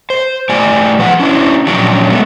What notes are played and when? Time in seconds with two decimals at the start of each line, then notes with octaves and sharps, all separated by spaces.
0.10 C5
0.49 A2 G4 D5 G#5
0.99 F3 B4 F5 F#5
1.20 C#4 D4 E4
1.67 A#2 F3 F#3 C#4 D4 G4
2.10 G#3 A3 B3